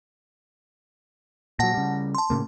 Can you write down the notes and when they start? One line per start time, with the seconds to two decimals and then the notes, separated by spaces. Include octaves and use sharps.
1.59 A#2 F#3 F#5 A5 A#6
1.74 C#3 G3
2.15 A5 C6
2.30 A2 C#3 A#3